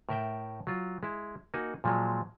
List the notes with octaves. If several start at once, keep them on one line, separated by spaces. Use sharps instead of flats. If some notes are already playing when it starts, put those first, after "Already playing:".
A2 A#4 E5 G5
F#3 F4
G#3 E4
A#3 D#4 F#4 G#5
A#2 F3 F#3 G#3